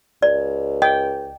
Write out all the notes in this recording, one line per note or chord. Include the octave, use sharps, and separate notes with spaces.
C#2 D5
D#5 G5